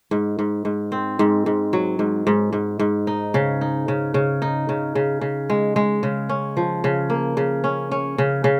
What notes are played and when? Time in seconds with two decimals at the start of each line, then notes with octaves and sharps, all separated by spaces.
0.11 G#2
0.39 G#2
0.65 G#2
0.92 C4
1.19 G#2
1.46 G#2
1.73 F#3
1.99 G#2
2.27 G#2
2.53 G#2
2.79 G#2
3.07 D#4
3.34 C#3
3.61 D#4
3.88 C#3
4.14 C#3
4.42 D#4
4.69 C#3
4.95 C#3
5.21 C#3
5.50 G#3
5.76 G#3
6.03 C#3
6.29 C#4
6.57 F3
6.84 C#3
7.10 A#3
7.37 C#3
7.64 C#4
7.91 C#4
8.18 C#3
8.44 C#3